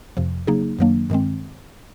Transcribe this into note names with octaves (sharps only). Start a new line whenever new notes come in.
F2 C3 F3
C#3 F#3 A#3 D#4 G#4
F#2 D#3 F#3 A#3 D4
G2 D#3 G#3 C4